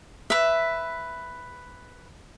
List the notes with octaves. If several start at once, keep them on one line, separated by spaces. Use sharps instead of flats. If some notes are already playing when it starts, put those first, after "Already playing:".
B4 E5